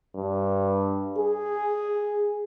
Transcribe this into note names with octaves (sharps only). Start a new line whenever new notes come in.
G2
G#4